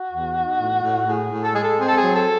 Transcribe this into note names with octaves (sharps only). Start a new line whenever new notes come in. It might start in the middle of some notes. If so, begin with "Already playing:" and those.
Already playing: F#4
E2
D#4
A2
A2
A2 G#4
A2
A4
G#3 G#4
A4
C4 G#4
A4
G#4
F#3
A4